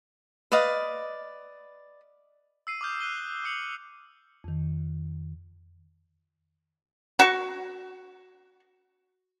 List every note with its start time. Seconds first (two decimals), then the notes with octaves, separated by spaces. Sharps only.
0.52 B4 D5 D#5 F5
2.67 E6 C7 D#7
2.81 D6 D#6 F6 G6
3.00 F#6 D#7 G7
3.44 D#6 C#7 F#7
4.44 F2 D#3
7.19 F#4 C#6